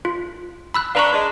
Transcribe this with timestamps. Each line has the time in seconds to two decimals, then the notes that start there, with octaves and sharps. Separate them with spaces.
0.05 F4
0.74 B5 E6 F#6
0.95 D4 B4 F5 A#5 C#6
1.12 G#3 D4